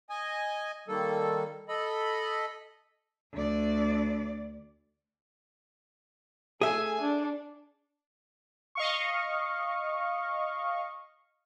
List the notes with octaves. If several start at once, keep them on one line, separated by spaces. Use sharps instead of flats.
D#5 G#5
D#3 G3 A#3 A4
A4 D#5 B5
D2 D5
A3 G#4 E5 G#5
D4
D#5 F5 C#6